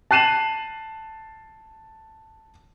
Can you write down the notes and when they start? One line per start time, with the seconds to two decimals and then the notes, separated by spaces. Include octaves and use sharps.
0.11 A5 F#6 C7 D#7 E7 F#7